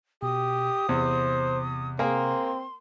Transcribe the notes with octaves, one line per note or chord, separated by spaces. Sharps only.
B2 G4 D#6
E2 C3 C5
A#3 C4 G#4 A#4 C6